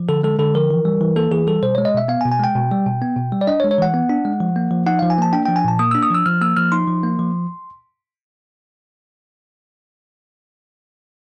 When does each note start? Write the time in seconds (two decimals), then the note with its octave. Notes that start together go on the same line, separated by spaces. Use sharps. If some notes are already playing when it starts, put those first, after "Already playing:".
Already playing: F3
0.09 D3 A4
0.23 G#3 A4
0.39 D3 A4
0.54 F3 A#4
0.71 E3
0.85 G3
1.01 E3
1.16 A#3 A4
1.31 E3 G#4
1.47 G3 A4
1.63 B2 C5
1.75 G#3 C#5
1.85 D#5
1.94 B2 E5
2.08 B3 F5
2.21 G#5
2.25 B2
2.32 G#5
2.39 G#3 G5
2.55 B2
2.71 G3
2.86 B2
3.02 B3
3.17 B2
3.32 G3
3.41 D5
3.47 D4 D#5
3.60 C#5
3.64 G#3
3.71 C#5
3.78 E3 F#5
3.94 B3
4.09 D4
4.25 G#3
4.40 F3
4.56 A#3
4.71 F3
4.86 D#4 F#5
4.99 F3 F5
5.10 G#5
5.18 A#3 A5
5.33 D4 G5
5.46 F3 G5
5.56 G#5
5.65 A#2 A5
5.79 A#3 D#6
5.91 D4 E6
6.03 D#6
6.11 F3 E6
6.26 F3 F6
6.42 A#3 E6
6.57 F3 F6
6.72 D#4 C6
6.87 F3
7.03 A#3
7.19 F3